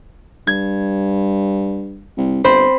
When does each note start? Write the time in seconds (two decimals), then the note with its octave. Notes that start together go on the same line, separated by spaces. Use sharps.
0.47 G2 G#6
2.17 C2
2.44 G1 C4 C5 B5